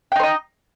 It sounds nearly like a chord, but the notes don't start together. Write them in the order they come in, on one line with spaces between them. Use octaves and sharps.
G5 D#4 C5 D#5